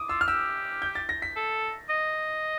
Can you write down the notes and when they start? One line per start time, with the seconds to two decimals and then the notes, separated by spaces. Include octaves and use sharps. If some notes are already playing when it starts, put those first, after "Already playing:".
Already playing: D6 D#6
0.09 F4 E6
0.21 F6
0.27 G4 E6
0.82 G6
0.95 A6
1.09 A#6
1.22 B6
1.36 A4
1.90 D#5